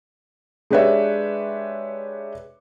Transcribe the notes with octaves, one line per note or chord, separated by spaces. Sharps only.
G#3 D4 G4 B4 C#5 E5